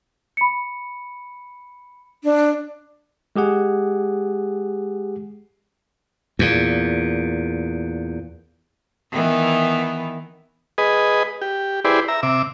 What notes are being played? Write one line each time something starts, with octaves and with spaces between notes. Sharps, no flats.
B5 C#7
D4
G#3 G4 G#4 F#5
E2 A#2
D#3 E3 B3
G#4 B4 D#5
G4
E4 G4 G#4 B4 C5 D5
E5 A#5
C3 E5 D6